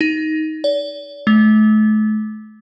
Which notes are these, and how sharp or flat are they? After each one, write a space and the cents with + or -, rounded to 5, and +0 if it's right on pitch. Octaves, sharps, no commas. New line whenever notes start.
D#4 +10
D5 -40
A3 -35